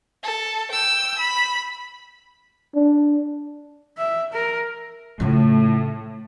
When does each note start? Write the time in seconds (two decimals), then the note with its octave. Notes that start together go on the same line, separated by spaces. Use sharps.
0.23 A4
0.72 G5 E6
1.19 B5
2.75 D4
3.98 E5
4.33 A#4
5.20 A2 C#3 F3